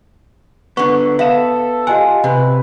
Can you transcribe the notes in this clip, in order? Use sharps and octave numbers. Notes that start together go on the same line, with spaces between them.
D3 B3 C#6
B3 A4 E5 F5 E7
F4 G4 D#5 F#5 G#5
C3 B4